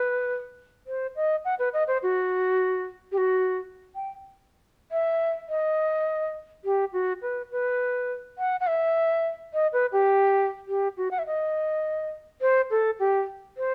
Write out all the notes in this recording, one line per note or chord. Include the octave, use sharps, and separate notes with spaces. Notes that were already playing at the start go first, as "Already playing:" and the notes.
Already playing: B4
C5
D#5
F#5
B4
D#5
C5
F#4
G4
F#4
G5
E5
D#5
G4
F#4
B4
B4
F#5
F#5
E5
D#5
B4
G4
G4
F#4
F#5
E5
D#5
C5
A4
G4
C5